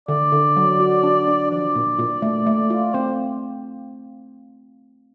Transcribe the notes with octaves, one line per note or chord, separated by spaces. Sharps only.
D3 D5
D3
F#3
F#4
D4
D4
F3 D5
A#2
A#2
A3
A3
F4
C4 C5